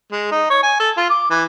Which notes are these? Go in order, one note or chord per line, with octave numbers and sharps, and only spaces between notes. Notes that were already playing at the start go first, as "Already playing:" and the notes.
G#3
D#4
C#5
G#5
A4
F4
D6
E3